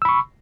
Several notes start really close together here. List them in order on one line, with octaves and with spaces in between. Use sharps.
E6 B5 C#6